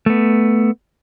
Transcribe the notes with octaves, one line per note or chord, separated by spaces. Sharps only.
A3 B3